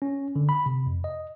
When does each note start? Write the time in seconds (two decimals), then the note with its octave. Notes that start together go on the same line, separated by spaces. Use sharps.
0.02 C#4
0.36 D3
0.49 B5
0.66 C3
0.86 F2
1.04 D#5